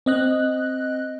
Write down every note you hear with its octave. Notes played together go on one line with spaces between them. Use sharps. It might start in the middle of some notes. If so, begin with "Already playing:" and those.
C4 D#5 F#6